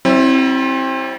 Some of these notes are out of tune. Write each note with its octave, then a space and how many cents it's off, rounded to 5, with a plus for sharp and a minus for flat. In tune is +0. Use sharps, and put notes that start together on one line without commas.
G3 -40 C4 +25 E4 -10